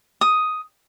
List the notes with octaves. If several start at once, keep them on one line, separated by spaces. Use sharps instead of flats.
D#6